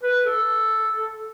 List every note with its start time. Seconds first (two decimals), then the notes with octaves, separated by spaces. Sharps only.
0.03 B4
0.25 A4